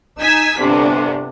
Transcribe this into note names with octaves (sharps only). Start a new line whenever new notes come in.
D#4 G#5 E6 B6
G1 C3 D4